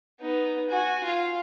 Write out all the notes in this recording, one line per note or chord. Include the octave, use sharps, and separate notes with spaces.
B3 D#4
F#4 G#5
F4 F5